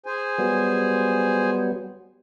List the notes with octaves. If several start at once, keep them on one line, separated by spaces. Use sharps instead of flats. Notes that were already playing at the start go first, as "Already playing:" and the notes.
G#4 C5 G#5
F#3 G3 B3